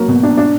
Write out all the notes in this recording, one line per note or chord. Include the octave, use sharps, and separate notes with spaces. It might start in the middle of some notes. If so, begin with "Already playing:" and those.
Already playing: F#3 A#3
B2
D4
D4